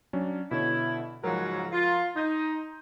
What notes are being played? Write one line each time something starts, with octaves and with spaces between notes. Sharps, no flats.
F#3 C#4 D4
B2 D3 E4 C#5
G#2 C#3 F3 F#3 A#4
F4
D#4 C6 G6 D#7